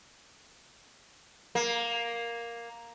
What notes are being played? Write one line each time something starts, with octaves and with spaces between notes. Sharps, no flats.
A#3